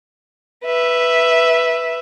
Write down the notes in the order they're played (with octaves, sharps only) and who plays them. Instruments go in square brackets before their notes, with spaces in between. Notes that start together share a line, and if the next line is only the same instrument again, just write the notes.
[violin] B4 E5